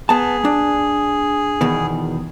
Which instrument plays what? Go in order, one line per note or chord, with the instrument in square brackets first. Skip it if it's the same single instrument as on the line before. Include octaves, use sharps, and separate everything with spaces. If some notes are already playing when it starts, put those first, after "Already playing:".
[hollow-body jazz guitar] B3 A5 [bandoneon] G#4
[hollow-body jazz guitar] D4
E2 B2 D#3